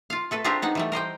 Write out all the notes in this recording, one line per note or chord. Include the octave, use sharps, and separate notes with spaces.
F4 F5
A3 A4 B4
C4 D4 F4 G4 G#4 A#4
B3 D#4 F#5
E3 G3 A3
A#4 C5 D#5 G5